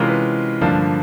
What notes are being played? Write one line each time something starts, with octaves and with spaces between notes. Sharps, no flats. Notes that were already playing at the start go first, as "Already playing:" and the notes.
Already playing: C3 E3 G#3 C#4 F4 A#4
B4
G2 D3 F3 A#3 D4